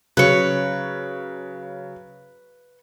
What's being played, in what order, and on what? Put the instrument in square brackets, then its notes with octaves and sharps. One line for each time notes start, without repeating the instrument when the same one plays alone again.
[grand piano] C#3 F#3 [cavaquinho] B4 C#5